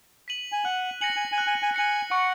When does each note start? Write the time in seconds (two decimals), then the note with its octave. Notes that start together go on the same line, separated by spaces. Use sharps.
0.28 B6 D#7 F#7
0.52 G#5
0.65 F#5 F#6
1.01 G#5 A#6 C#7 F#7
1.16 G#5
1.32 G#5
1.38 F#6
1.47 G#5
1.62 G#5
1.74 G#5 A#6 C#7 F#7
2.11 F#5 C#6